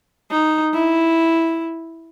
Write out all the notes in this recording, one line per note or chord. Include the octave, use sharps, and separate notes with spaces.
D#4
E4